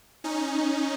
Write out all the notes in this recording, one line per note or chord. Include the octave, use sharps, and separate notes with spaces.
C#4 D#4